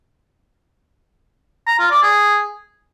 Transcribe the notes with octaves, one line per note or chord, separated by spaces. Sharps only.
A#5
F4
D5
G#4